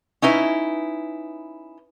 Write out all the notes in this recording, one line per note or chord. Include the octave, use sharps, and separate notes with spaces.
C#4 D#4 E4 B4